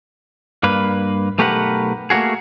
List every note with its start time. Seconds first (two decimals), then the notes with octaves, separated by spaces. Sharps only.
0.63 G2 A#3 B4
1.38 B1 A3 G4 A#4 B4 F#5
2.10 A3 A#3 C#4 F#4 G#4